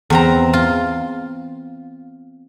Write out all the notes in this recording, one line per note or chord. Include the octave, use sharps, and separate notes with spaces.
E2 C4 A#5
F4